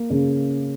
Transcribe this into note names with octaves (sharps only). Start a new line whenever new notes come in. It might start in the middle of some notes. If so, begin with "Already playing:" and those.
Already playing: A#3
C#3